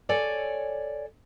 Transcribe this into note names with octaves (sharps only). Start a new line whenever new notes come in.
A4 C#5 D5 G#5